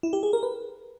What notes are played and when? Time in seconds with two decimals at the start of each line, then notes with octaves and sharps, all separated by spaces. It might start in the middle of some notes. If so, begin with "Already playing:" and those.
0.03 E4
0.13 G4
0.23 G#4
0.33 A#4
0.43 B4